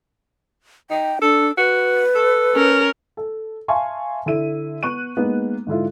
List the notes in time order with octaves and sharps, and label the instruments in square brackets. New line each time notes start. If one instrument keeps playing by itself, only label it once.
[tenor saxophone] D#4 [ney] G5
[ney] D4 [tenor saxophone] A4
[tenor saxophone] F#4 [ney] B4
[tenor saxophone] A4
[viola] C#4 A#4
[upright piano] A4
E5 F5 G#5 A5 C6 C#6
D3 E4 D#7
B3 C#6 F#6 D#7
G#3 A#3 B3 D#4
G#2 D3 E4 F4